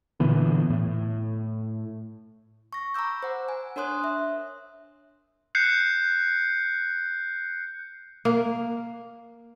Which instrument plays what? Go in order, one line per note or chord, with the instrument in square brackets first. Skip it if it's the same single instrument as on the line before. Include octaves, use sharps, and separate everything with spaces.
[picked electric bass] A#2 D3 E3 B3
A2
[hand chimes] C#6 A#6
A#5 B5 D6 E6 G6
C5 F#5
G#5
D4 A#4 C#5 C6 D#6 F#6
E5
[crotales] F#6 G6 C7 C#7
[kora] A#3